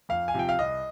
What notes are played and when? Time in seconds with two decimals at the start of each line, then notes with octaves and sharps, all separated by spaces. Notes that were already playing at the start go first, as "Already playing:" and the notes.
0.09 F2 F5
0.28 G#5
0.34 C3 F3 G5
0.49 F5
0.59 C2 D#5